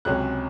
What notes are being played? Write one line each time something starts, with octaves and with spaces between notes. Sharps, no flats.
C#2 C3 F#3 C#4 F#6